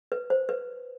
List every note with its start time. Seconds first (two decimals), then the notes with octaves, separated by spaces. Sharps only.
0.12 B4
0.30 C5
0.49 B4